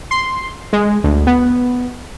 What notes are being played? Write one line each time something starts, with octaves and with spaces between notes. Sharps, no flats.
C6
G#3
D2
B3